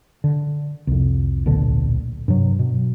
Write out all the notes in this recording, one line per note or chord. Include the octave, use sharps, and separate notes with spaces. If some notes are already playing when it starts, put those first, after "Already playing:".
D3
C2 F2
D1 A#1 B2 D3
G2 C3 F#3
B2